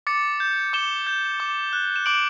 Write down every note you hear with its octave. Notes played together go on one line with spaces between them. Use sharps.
D6 A6 C#7
G6
D6 E7 G7
G6
D6
F#6
E7
D6 D7 F#7